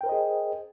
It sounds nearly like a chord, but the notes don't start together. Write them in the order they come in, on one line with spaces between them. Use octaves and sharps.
G5 A#4 C5 D#5 G#4